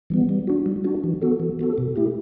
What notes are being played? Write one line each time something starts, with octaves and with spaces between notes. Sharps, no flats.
E3 G3 B3
G3
D4 F#4
G3
D4 F#4
E3
B3 F#4 A4
E3
B3 F#4 A4
B2
A3 E4 G4